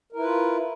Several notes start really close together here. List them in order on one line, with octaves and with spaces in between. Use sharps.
A#4 E4 B4 F4